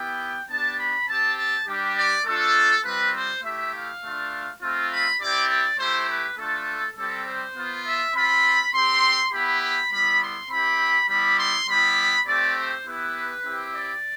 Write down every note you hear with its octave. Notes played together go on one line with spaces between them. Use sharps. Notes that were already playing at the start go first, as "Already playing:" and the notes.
Already playing: B3 E4 G4 G5
B3 D4 G4 A5
B5
C4 G4 A5
A5
G3 D4 G4
D5
A3 D4 F4 A4
G3 C4 F4 B4
C5
A3 E4 G4 E5
F5
A3 D4 F4
A3 C4 F4
B5
C4 E4 G4 D5
D5
A3 E4 G4 C5
B4
A3 D4 F4 A4
G3 C4 G4 A4
C5
B3 F4
E5
C4 F4 B5
C4 G4 C6
B3 E4 G4 B5
B5
G3 B3 E4 B5
C6
C4 E4 G4 B5
G3 B3 E4 G4 B5
C6
G3 B3 E4 G4 B5
A3 C4 G4 D5
C5
B3 E4 G4 B4
C4 E4 G4
D5